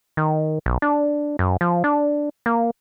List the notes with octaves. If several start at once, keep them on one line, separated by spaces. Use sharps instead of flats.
D#3
B1
D4
F#2
F3
D4
A#3